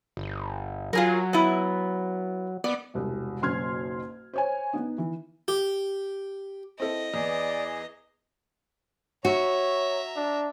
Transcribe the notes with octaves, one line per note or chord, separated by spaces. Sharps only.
G1
F#3 F4 G#4 A#4
B3 E4
B3 D5
E1 C2
F#1 B1 C#4 C6 F6 G#6
C5 C#5 G#5
B3 D#4
E3
G4
C4 E4 A4 D#5
E2 E3 B3 G#4 D5
F#4 C#5 E5 A#5
D4